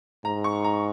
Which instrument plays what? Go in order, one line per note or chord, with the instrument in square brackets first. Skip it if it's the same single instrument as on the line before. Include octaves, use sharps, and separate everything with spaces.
[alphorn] G#2 [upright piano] A#5
[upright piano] C#6
A#5